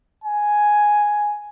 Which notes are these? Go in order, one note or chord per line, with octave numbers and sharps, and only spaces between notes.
G#5